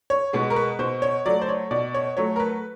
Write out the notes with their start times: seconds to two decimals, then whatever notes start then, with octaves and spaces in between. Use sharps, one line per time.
0.10 C#5
0.33 B2 G#3 B3
0.50 A#4
0.56 B4
0.79 B2 C5
1.02 C#5
1.26 F#3 A3 D5
1.42 C5
1.49 C#5
1.71 B2 D5
1.94 C#5
2.17 F#3 A3 C#5
2.36 A#4
2.40 B4